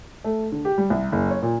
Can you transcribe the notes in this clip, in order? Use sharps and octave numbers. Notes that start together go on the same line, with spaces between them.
A3
D3
G4
G3
C2
F#1
C#5
A#2